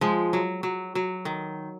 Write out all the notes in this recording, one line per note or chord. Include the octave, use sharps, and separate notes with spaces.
F3 G#3
F#3
F#3
F#3
D#3